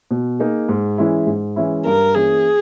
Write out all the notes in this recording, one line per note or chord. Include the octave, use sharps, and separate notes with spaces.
B2
A#3 D#4 G#4
G#2
E3 G#3 C#4 E4
G#2
E3 G#3 C#4 E4
G2 A#4
E3 A#3 C#4 G#4